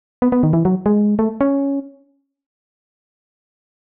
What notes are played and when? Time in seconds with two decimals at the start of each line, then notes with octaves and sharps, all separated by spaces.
0.22 B3
0.32 B3
0.43 D#3
0.53 E3
0.65 F#3
0.86 G#3
1.19 A3
1.41 C#4